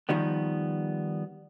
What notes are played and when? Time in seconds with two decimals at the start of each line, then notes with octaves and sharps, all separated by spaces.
0.09 D#3 F3 G3 B3